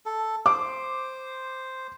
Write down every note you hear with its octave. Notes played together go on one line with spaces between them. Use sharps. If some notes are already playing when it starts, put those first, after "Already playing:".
A4
C5 D6